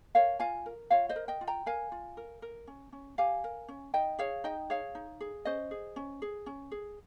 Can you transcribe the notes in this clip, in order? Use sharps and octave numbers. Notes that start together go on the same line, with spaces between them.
A#4 C#5 F5
F4 F5 G#5
A#4
F4 C#5 F5
C5 D#5
A#4
D#5 G5
F4
G5 A#5
A#4 F5 G#5
F4
A#4
A#4
C#4
C#4
G4 F5 G#5
A#4
C#4
D#4 D#5 G5
G#4 C#5 F5
D#4 D#5 G5
G#4 C#5 F5
D#4
G#4
C#4 C5 D#5
G#4
C#4
G#4
C#4
G#4